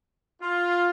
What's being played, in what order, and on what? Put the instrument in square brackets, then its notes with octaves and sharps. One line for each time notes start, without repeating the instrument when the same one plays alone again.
[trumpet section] F4